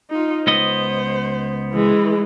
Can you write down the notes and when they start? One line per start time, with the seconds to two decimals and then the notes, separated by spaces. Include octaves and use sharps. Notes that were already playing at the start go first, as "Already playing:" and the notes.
0.10 D#4 F4
0.47 C#2 B3 C5 D#5
1.72 E3 G#3